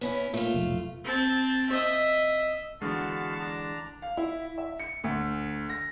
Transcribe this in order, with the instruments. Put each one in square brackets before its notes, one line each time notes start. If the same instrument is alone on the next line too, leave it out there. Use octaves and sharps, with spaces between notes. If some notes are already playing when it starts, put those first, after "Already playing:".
[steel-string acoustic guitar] B3 C#4 E4
[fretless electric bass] A#2 [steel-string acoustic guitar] A3 F4
[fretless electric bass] F1 B1
[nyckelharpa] C4 A5
D#5 E5
[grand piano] D3 [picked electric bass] E3 G#3 [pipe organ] B3 F#4 F5 [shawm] A5
[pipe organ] D4 A#5
[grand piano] F5
E4
E5
C#7
D2
A#6